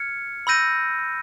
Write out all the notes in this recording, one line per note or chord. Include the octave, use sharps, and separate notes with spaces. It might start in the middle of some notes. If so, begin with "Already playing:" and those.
Already playing: F6 G#6 C#7
B5 E6 G6 A#6 D#7